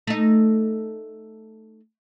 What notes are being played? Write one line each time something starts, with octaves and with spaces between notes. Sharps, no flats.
A3 D#4